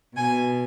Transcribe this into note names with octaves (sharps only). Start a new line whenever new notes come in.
B2 G#5